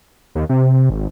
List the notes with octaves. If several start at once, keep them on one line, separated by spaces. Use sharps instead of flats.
D#2
C3
G#1